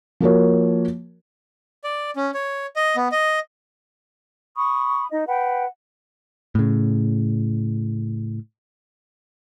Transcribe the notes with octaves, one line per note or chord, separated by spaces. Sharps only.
F3 A#3 F#4 A#4 C#5
D5
C#4
C#5
D#5
B3
D#5
B5 C#6 D#6
D#4 D#5
B4 F#5 G5
A2 C#3